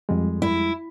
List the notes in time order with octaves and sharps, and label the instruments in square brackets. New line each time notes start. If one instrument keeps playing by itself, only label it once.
[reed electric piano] F2 G3 G#3
[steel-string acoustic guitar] E4